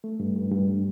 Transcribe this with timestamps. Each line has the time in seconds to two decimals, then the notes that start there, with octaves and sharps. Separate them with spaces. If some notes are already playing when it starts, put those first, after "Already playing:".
0.04 A3
0.20 G2
0.36 G2
0.52 G2